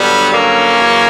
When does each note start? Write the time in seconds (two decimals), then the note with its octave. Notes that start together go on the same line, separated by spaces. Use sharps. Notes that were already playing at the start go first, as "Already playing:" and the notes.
Already playing: G2 D3 F#3 G3 B3
0.34 A#3 C#4
0.76 F#2 C#3 E3